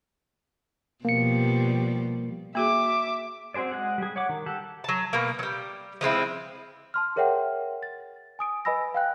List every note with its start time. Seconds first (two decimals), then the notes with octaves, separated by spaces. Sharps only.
1.05 B2 F3 G3 A#3 C#7
2.55 A#3 F#4 G#4 E5 D6
3.54 C4 F#4 G#4 C5 D5
3.71 G#3 G#4 F#5
3.98 G3 G#4
4.16 C#5 F#5 D6
4.29 D#3
4.46 G4 A4 F#5
4.84 F#3 A5
5.13 B2 A#3
5.39 F#3 G3
6.01 F3 G#3 C4 E4
6.94 A5 C6 F6
7.16 G#4 A#4 C#5 E5 F#5 G5
7.83 A6
8.39 G#5 D#6 D7
8.65 B4 D#5 G#5 B5 E6 A#6
8.94 F5 G5 F#6